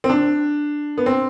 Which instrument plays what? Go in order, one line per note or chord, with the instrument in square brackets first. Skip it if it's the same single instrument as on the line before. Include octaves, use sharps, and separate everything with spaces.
[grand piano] C4
D4
B3
C4